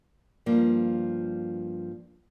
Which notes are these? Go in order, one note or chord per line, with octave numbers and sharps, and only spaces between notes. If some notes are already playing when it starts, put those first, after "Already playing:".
G2 F3 A#3